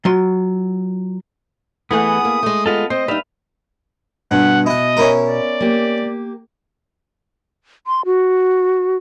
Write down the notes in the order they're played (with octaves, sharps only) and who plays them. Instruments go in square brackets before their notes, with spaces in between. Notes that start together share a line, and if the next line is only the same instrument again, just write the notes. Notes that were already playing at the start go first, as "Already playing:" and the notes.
[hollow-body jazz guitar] F#3 F4 C6
[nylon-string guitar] E3 A3 [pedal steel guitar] B3 G#4 F#5 [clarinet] D#6
[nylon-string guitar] A#3
G#3 A3
[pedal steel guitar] B3 F4 A4 [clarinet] D#5
[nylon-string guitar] C4 [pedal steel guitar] C5 [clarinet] D#5
[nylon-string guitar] G3 D#4 [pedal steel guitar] B4 E5 F5
[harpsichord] G2 [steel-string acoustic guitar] B2 [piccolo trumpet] F#5
[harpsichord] E4 F#5 [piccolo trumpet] D#5
[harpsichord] C#4 E4 A#4
[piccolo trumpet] D5
[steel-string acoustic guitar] A#3 G4
[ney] C6
F#4